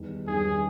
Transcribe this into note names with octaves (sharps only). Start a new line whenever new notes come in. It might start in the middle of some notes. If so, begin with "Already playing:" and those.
Already playing: E2 D#3 G3
G2 D#3 G3 C#4 G#4